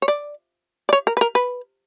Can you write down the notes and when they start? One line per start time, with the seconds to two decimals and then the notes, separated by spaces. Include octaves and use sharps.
0.02 C#5
0.08 D5
0.89 D5
0.93 C#5
1.07 A#4
1.17 B4
1.21 A#4
1.35 B4